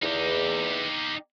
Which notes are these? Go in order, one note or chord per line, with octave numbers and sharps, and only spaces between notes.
E2 D#4 G4